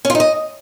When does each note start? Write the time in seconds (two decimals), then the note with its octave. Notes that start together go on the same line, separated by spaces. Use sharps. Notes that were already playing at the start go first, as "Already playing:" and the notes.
0.05 C#4
0.10 F4
0.15 D#4
0.20 D#5